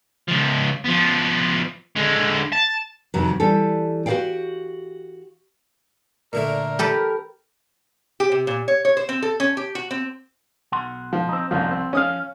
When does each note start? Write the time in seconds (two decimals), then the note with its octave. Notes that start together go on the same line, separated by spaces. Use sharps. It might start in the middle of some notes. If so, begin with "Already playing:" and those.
0.28 C#2 F3
0.85 F3 B3
1.96 D3 G#3
2.52 A5
3.14 F2 C3 D#3 F#3
3.40 E3 G3 G4 A4
4.06 F#4 G4 A4 D5 F5 G5
6.33 A#2 D3 A3 A#4
6.79 G4 A4 B4
8.20 G4
8.32 C3
8.47 A#2
8.68 C#5
8.85 C#5
8.97 C5
9.09 C4
9.22 A4
9.40 C#4
9.57 G4
9.75 F#4
9.91 C4
10.72 B1 F#5 C6
11.13 F3
11.29 C4 D#4
11.51 C2 F3 A#3 C#4 D#4
11.71 C4
11.93 F3 C#4 F5 D#6